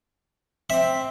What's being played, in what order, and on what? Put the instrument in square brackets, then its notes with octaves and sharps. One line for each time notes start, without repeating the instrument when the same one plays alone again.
[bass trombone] C4 [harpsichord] E5